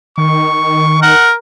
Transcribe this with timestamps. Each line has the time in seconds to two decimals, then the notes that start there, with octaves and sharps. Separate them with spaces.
0.18 D#3 C#6
1.02 A#4 F#5